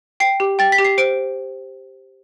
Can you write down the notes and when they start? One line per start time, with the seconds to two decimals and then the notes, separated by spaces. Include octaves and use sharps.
0.20 G5 C7
0.40 G4
0.59 G5 A6
0.72 B6
0.79 G4
0.85 C7
0.98 C5 D7